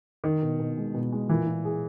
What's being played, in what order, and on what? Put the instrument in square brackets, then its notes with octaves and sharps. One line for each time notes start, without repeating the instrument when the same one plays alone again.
[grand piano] D#3 [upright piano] D#4
[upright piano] B2
B2
G#3
B2
G#3
[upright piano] A#2 [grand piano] E3
[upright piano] A#2
G#4